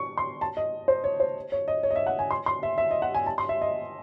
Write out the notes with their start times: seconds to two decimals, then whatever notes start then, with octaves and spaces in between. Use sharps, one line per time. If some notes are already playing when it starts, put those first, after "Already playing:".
Already playing: C#6
0.18 C6
0.41 A5
0.57 D#5
0.88 C5
1.04 C#5
1.20 C5
1.52 C#5
1.68 D#5
1.83 C#5
1.91 D#5
1.96 E5
2.07 F#5
2.19 G#5
2.31 C6
2.46 C6
2.63 E5
2.78 E5
2.91 D#5
3.02 F#5
3.14 G#5
3.26 A5
3.38 C6
3.49 E5
3.61 D#5